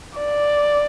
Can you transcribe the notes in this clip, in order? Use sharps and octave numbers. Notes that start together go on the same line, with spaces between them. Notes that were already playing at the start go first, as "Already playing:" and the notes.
D5